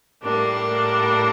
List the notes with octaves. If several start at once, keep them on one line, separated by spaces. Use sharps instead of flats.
A2 G3 A#3 D4